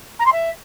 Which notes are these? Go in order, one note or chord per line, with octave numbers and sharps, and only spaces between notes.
A#5
C6
E5